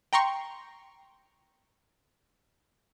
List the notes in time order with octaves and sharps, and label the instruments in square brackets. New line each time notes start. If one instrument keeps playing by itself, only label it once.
[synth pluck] G5 A#5 C6 C#6